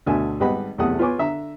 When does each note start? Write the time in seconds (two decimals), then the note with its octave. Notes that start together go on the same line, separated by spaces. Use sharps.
0.06 D2 B2 D3 A4 E5 G#5
0.40 G#1 G3 B4 D#5 F#5 B5
0.78 B1 E2 C3 A3 F#5 D#6
0.99 F4 B4 C#5 G#5 C#6 D6
1.18 D3 E5 A#5